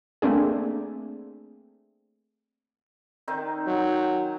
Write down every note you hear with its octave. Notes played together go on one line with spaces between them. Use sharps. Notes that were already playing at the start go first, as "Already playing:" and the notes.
A3 A#3 C4 D4 G#4
D#3 C4 D#4
F#3